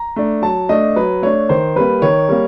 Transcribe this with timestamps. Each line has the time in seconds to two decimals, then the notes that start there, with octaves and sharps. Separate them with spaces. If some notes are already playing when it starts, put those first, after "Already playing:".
Already playing: A#5
0.16 A3 D4
0.42 F#3 A5
0.69 A3 D4 D#5
0.96 F#3 B4
1.22 A3 D4 C#5
1.49 D#3 C5
1.76 G3 A#3 B4
2.02 D#3 C#5
2.29 G3 A#3